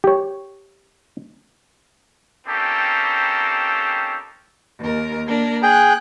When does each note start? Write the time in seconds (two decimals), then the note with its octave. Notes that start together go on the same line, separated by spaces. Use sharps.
0.04 G4 C#5
2.46 A#3 C4 C#4 D#4 G4 A4
4.79 D#2 A#4
5.26 A#3 D4 A#4
5.63 G#4 G5 F#6